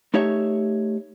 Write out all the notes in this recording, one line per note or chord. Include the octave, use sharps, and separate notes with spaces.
A3 D#4 G4 C#5 E5